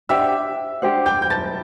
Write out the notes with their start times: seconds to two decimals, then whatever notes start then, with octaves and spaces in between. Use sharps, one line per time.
0.09 D4 G4 C5 E5 F#5 E6
0.82 D4 G4 C5 F#5
1.06 G5 G6
1.22 G6
1.30 A5 A6